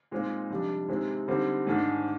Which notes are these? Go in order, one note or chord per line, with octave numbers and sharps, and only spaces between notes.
A#2 G#3 C4 D#4
F2 C3 G3 D4
C3 D#3 G#3 C4 D#4
D3 G3 C4 D#4
G#2 D#3 G#3 D4